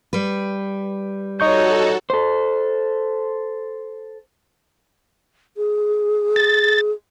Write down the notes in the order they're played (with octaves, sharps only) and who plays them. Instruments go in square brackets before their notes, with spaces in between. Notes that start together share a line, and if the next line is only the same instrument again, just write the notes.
[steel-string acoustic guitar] G3 B4
[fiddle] D#4 C#5 [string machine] F#4 A4 [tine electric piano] D#5 C#6 G6
[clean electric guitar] A4 C5
[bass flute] G#4
[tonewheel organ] A6